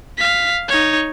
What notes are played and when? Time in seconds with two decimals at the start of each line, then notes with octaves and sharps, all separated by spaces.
0.18 F5 B6
0.68 D#4 C#5